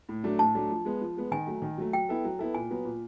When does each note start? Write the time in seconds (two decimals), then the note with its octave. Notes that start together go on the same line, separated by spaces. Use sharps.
0.09 A2
0.24 F#3 A3 D4
0.39 A2 A5
0.55 F#3 A3 D4
0.70 F3
0.85 G#3 B3
1.01 F3
1.17 G#3 B3
1.31 D#3 G#5
1.47 F#3 A3
1.62 D#3
1.78 F#3 A3
1.93 F#3 G5
2.09 B3 E4 A4
2.24 F#3
2.39 B3 E4 A4
2.55 A#2 G#5
2.71 F#3 B3
2.85 A#2